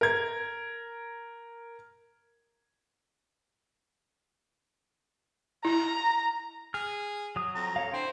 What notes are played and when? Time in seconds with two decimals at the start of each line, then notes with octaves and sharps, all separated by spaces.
0.01 A#4 G#6
5.65 E4 A#5
6.74 G#4 F6
7.36 F#3 D#6
7.55 F2 A#5
7.76 A4 C#5 F5
7.93 D4 E4 C5 G5